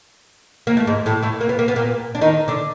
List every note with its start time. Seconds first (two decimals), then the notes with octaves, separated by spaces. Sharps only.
0.67 A#3
0.77 A3
0.87 G#2 G#3
1.06 A2 A3
1.23 A2 A3
1.41 A#3
1.49 B3
1.59 A#3
1.68 B3
1.76 A#2 A#3
2.15 D4
2.21 D#3 D#4
2.48 D3 D4